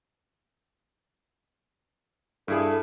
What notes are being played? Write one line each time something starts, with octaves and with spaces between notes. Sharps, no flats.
G2 E4 G#4 A4